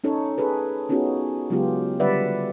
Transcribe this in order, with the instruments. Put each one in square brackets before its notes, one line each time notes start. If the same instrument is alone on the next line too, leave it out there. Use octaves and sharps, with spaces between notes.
[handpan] C#4 D#4 A4 C#5
G#4 A4 B4
B3 C#4 D#4 F4 F#4 G#4
C#3 F#3 G#3 B3 F4 G4
D3 G3 B4 D5 E5 F#5